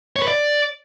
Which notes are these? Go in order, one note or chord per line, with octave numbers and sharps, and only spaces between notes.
C#5
B4
D5